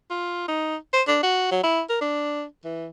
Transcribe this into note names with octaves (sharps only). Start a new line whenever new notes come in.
F4
D#4
C5
D4
F#4
F#3
E4
A#4
D4
E3